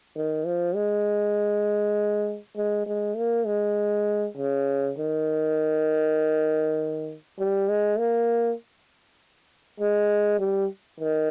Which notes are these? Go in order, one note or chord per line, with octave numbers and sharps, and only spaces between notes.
D#3
F3
G#3
G#3
G#3
A#3
G#3
C#3
D#3
G3
G#3
A#3
G#3
G3
D#3